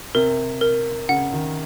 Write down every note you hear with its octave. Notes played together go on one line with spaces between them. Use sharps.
C3 A#4
A#4
C#3 F#5
D#3